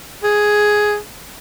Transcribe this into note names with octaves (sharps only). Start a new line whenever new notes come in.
G#4